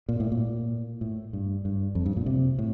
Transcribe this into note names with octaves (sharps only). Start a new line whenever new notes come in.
A#2
A2
A#2
A2
G2
G2
F2
G2
A#2
C3
A2